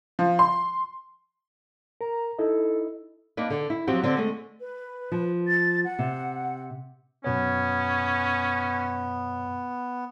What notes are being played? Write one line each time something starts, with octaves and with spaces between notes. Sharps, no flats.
F3
C6
A#4 A#5
D#4 E4 A4 D#5
A#3 D4 D#4 B4
D3
E4
F3 F#3 C4 F#4 G4
D3 C4
G#3 A3
B4
F3
A6
F#5
C3
F#2 B2 B3 C#4 C#5